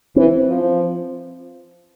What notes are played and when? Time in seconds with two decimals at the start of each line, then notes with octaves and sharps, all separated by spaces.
0.16 E3 C4
0.50 F3